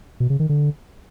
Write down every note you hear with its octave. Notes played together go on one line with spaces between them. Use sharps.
B2
C#3
D#3
D3